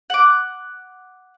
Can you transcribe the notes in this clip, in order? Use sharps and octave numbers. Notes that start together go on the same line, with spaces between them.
F#5 D6